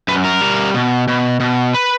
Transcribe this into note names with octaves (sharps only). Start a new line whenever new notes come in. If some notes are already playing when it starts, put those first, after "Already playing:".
F#2 B4
A#4
G3
B2
B2
B2
B4